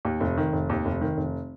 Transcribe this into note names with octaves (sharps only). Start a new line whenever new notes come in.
D#2
F1
D#3
F1
D#2
F1
D#3
F1